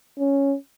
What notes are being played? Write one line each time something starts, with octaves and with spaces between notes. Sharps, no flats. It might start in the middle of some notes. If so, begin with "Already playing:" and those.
C#4